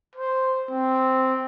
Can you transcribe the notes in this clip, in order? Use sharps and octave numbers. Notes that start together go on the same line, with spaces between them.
C5
C4